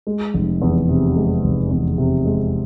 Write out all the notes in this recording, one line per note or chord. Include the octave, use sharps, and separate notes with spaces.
G#3
F1
E2
C3
G#3
F1
E2
C3
G#3